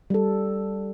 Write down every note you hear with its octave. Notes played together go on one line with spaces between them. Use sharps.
G3 A4